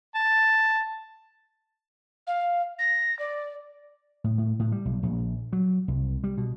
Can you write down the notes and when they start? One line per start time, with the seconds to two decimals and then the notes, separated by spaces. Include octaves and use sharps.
0.15 A5
2.27 F5
2.78 A#6
3.19 D5
4.24 A2
4.38 A2
4.59 A2
4.72 G3
4.85 B1
5.03 A#1
5.53 F#3
5.88 C2
6.24 G3
6.38 B2